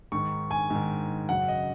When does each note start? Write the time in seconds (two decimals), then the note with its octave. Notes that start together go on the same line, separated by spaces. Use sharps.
0.12 G#2 D#3 C#6
0.51 G#5
0.70 G#2 D#3
1.29 F#2 C#3 F#5
1.48 D#5